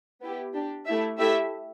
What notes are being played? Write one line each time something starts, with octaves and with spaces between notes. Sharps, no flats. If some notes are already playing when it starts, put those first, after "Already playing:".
B3 E4 G4
D4 G4
A3 E4 G4 E5
A3 E4 G4 E5